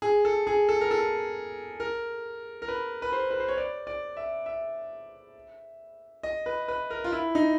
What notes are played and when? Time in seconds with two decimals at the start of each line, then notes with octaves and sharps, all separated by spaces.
0.02 G#4
0.25 A4
0.47 G#4
0.69 A4
0.81 A#4
0.91 A4
1.80 A#4
2.62 A#4
2.68 B4
3.02 B4
3.12 C5
3.31 B4
3.40 C5
3.48 C#5
3.58 D5
3.87 D5
4.17 E5
4.46 E5
6.23 D#5
6.46 B4
6.68 B4
6.90 A#4
7.04 F4
7.12 E4
7.35 D#4